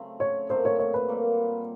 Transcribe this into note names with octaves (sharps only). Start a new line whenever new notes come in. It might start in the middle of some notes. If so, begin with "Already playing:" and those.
Already playing: C#3 F#3 A3 C4
C#5
A#2 F#3 A3 C4 C5
C#5
C#5
B4
A#2 G3 A#3